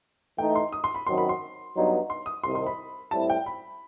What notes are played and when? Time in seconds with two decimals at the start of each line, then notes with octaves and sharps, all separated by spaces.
0.37 E3 A3 D#4 G5
0.55 C6
0.72 D#6
0.84 C6
0.94 B5
1.07 F#2 D#3 F#3 C4 F#4 C6
1.18 B5
1.29 C6
1.75 G2 F#3 B3 D#4
2.10 C6
2.26 D#6
2.44 C2 C3 D#3 C6
2.55 C6
2.66 B5
3.11 A2 G3 C4 E4 A5
3.30 G5
3.46 B5